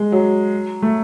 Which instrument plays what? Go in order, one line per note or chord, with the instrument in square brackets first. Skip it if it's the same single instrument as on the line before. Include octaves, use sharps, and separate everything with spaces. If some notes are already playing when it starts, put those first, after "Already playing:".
Already playing: [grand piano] G#3
F#3
A3